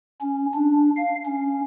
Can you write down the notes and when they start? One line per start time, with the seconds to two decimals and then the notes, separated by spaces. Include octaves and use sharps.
0.21 C#4
0.54 D4
0.97 F5
1.25 C#4